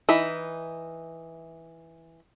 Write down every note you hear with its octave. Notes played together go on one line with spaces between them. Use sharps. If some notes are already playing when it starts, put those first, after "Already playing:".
E3 D#4 E5 B5